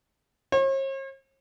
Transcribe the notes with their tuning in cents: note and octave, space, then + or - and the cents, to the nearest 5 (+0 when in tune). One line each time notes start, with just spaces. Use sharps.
C#5 -45